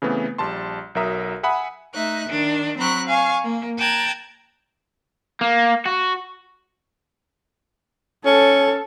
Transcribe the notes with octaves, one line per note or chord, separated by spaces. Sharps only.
C#3 E3 A3 B3 C4
A#1 G3 A5 C6
B1 F#3 A#4 E5 A#5 D#6
E5 F#5 G#5 B5 D#6
A3 D#4 E5 F#6
D#3 D4
F#3 C4 A#5 B5 C#6 F#6
F5 G#5 C#6
A#3
G5 A5 A#5 F#6 G#6
A#3
F#4
C#4 A4